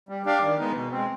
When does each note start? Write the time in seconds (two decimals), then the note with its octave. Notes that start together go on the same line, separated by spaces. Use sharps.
0.09 G3
0.26 D4 G4 D5 F5
0.42 D#3
0.59 G#3 B3 D#4
0.75 B2
0.91 C4
0.96 G#3